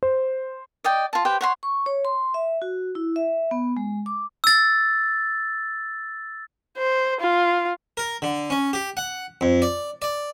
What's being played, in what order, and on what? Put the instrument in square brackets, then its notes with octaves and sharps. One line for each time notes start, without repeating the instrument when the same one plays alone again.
[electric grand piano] C5
[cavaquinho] D5 D#5 G5
F4 A5
G4 B4 C5 G5
C#5 F#5 C6
[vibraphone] C#6
C#5
C6
E5
F#4
E4
E5
B3
G#3
D6
[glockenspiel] E6 A6
[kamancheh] C5
F4
[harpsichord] A#4
D3
C#4
G4
F#5
F2
D5
D5